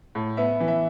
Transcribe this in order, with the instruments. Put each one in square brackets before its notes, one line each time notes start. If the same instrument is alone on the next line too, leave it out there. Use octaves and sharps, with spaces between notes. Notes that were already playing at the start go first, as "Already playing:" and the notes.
[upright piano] A2
B3 E5
E3
E5